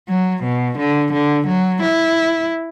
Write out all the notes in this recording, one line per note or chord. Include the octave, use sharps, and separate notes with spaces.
F#3
B2
D3
D3
F#3
E4